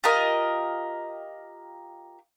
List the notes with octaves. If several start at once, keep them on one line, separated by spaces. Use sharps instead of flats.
F4 G4 A#4 D#5